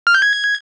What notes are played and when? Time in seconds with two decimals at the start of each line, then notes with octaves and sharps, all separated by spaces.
0.07 F6
0.14 G6
0.22 G#6